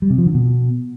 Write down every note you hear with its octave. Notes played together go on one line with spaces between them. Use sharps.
G3
C3
F3
D3
B2